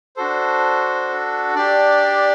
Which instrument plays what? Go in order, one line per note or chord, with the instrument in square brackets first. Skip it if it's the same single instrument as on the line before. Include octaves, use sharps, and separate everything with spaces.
[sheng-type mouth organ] D4 F#4 A4 C5
D4 G4 D5